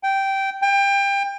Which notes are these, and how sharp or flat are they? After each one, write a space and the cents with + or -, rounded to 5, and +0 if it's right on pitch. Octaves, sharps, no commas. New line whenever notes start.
G5 -10
G5 +25